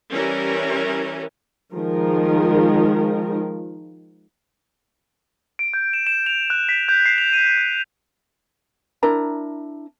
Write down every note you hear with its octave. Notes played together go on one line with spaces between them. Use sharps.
E3 G3 C#4 A#4
D#3 F3 G#3 A#4
D7
G6
E7
E7
F7
F#6
B6
G6
C7
F7
D#7
F#6
D4 E4 A#4 A#5